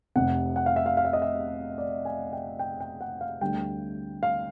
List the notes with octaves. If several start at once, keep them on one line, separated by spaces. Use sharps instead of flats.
F1 F2 C3 F#5
F#5
F5
E5
F5
F5
E5
D#5
E5
D5
G#5
G5
G5
G5
F#5
F5
D2 D3 G3 G5
F5